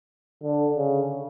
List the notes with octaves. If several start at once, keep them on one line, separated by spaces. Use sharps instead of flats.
D3
C#3